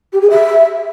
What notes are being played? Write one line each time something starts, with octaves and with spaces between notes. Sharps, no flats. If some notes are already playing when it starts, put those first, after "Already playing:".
G4
G#4
E5